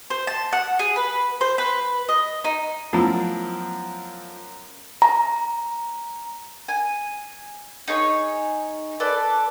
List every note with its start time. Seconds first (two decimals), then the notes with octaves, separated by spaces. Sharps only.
0.10 C5
0.27 A5
0.52 F#5
0.79 G#4
0.96 B4
1.41 C5
1.58 B4
2.09 D#5
2.44 D#4
2.93 F#2 F3 A3 B3 E4
5.02 A#5
6.68 G#5
7.88 D#4 G#4 C#5 C#6
9.00 A4 B4 D5